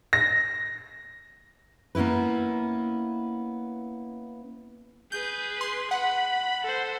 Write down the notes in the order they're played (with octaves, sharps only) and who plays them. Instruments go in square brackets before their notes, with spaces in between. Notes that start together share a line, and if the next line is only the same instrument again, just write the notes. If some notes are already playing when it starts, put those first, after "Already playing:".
[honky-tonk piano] A#6
[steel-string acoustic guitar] A#3 B3 C#4 E4 B4
[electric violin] G#4 B4 [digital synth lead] G6
[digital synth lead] C6
[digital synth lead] F#5 [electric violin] B5
[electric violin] A4 C5